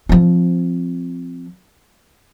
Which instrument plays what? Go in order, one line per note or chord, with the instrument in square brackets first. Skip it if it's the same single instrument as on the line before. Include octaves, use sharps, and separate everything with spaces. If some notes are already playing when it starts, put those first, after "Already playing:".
[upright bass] F3 C4